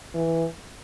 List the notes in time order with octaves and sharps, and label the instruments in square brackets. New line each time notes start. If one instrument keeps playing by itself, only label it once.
[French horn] E3